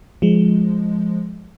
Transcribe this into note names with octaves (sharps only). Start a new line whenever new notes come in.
F3 G#3